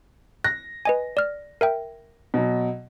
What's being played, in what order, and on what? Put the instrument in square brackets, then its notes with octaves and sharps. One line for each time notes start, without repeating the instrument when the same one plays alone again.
[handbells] F#6 [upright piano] A#6
[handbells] B4 D#5 G#5
D5 F6
A#4 E5 G5
[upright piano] B2 F#3